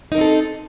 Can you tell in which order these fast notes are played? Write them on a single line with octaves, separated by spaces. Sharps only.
D#4 A#4 C4 A4